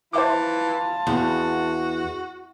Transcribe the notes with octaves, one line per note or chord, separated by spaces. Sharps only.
E3 F4 C5 E5 A5 D6
E2 F#4